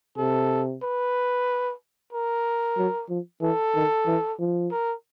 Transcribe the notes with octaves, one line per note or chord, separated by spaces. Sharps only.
C3 A4
B4
A#4
F#3
F3
E3 A4
D#3
E3
F3
A#4